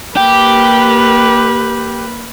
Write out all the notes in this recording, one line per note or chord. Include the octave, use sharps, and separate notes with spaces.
A#3 G4 B4